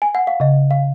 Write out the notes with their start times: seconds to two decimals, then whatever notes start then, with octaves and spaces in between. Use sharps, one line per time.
0.02 G#5
0.15 F#5
0.27 F5
0.40 C#3 D#5
0.71 F5